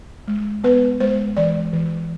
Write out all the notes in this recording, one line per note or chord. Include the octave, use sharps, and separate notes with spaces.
G#3
B3 B4
G#3 C5
E3 D5
E3